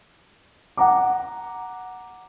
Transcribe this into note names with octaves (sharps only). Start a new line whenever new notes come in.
F#5 A#5 D6